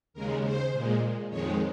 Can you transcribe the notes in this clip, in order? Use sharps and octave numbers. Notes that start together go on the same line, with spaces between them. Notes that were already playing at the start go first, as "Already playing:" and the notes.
D#2 C#3 G#3 A#4
C5
A#2 G#3
F2 D#3 G#3 C#5